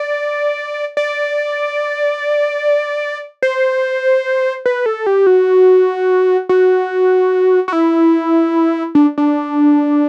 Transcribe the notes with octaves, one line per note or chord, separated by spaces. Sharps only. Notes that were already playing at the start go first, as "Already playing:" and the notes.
Already playing: D5
D5
C5
B4
A4
G4
F#4
F#4
F#4
E4
D4
D4